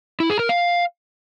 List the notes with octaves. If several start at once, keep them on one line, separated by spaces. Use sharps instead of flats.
E4
G#4
A#4
F5